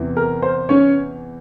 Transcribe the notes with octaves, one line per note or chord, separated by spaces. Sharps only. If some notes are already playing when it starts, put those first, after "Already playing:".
Already playing: E2 C3 E3
A#4
C5
C#4 C#5